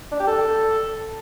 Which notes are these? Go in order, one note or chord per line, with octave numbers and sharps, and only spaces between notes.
D4
G4
A4